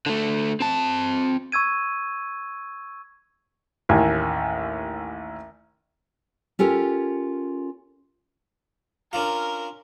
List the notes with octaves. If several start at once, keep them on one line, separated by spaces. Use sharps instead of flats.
D3 A3
C4 A5
C#6 E6 G#6 D#7
A1 D#2 G#5
C#4 F4 G4 A4 A#4
C#4 D4 F4 A#4